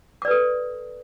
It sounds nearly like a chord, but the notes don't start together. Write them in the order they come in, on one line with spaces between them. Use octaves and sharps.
D6 D5 B4 A4